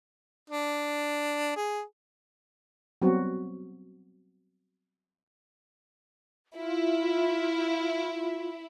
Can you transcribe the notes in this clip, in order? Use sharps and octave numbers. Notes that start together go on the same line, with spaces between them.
D4
G#4
F#3 G3 B3 C4 F#4
E4 F4